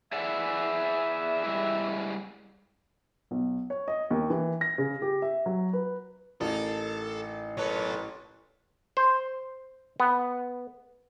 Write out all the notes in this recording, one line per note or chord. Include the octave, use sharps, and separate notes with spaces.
E3 G#4 D5 E5 F#5
G3 G#3 E4
B1
C#5
D#5
D#2
E3
A#6
C#3
G4
E5
F#3
B4
A1 A#3 D#4 A4
B1 A#2 A4 B4 C#5
C5
B3